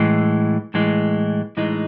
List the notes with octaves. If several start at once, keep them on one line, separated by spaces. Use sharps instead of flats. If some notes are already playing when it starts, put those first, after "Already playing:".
Already playing: A2 E3 G#3
A2 E3 G#3
A2 E3 G#3 D#4